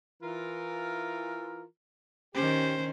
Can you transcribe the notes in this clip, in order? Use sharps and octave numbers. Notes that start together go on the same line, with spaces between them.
E3 F4 A#4
D#3 C#4 G4 C5